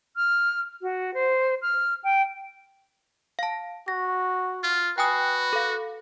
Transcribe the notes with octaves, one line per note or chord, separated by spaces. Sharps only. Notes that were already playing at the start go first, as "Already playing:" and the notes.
F6
F#4
C5
F6
G5
F5 A5
F#4 A#6
F4
F#4 B4 G5 G#5 D#6
A4 F5